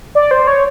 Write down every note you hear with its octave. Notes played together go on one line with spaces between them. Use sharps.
D5
C5
C#5